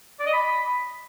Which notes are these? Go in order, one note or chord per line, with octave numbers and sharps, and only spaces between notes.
D5
D#5
B5